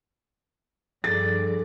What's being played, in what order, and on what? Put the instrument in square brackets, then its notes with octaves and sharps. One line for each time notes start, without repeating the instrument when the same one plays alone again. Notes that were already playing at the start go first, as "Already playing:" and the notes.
[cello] G2 D5 [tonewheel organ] F3 G#4 A4 [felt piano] A6